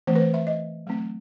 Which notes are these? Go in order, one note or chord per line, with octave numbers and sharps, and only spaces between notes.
E3 A3 C4 C5
B4
C5
E5
D#5
F#3 A3 C4